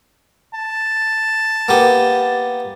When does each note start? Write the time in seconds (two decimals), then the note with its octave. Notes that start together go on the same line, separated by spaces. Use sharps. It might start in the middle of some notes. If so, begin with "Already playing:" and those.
0.54 A5
1.68 A#3 B3 G4